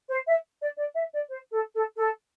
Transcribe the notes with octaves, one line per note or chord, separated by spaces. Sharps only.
C5
E5
D5
D5
E5
D5
C5
A4
A4
A4